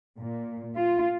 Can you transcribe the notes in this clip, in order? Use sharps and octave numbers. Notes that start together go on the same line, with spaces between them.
A#2
F4